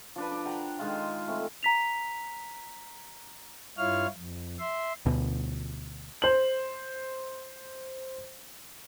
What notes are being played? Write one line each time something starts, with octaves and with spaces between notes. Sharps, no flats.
F3 D4 B4
D4
F#5 G5 A#5
D#3 G#3 F4
A3 C4
A#5 B6 F7
G2 E4 F4 C#5 F5 F6
F2
E5 C6
D2 B2
C5 F#7